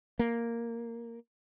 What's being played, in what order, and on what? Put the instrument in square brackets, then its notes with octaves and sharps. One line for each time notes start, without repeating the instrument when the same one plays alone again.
[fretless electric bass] A#3